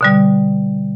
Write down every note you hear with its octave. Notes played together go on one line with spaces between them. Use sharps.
B2 D3 G3